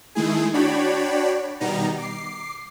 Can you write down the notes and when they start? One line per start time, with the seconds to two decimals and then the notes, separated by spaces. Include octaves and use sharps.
0.15 D#3 G#3 A3 E4 G#4
0.54 D4 F#4 C#5 D5 G5 B5
1.60 B2 D#3 G3 B3 D#4 A#5
1.98 D6 C7